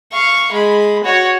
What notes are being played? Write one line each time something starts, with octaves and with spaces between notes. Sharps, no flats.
F5 C#6
G#3 B5
F#4 C#5